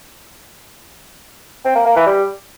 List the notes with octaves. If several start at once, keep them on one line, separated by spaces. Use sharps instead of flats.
C4
A#3
A#3
E3
G3